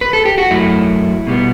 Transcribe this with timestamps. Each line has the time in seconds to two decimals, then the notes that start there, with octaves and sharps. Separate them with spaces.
0.01 B4
0.13 A4
0.25 G4
0.38 F#4
0.51 F#2 F#3 A3 E4
1.27 B2 G3 B3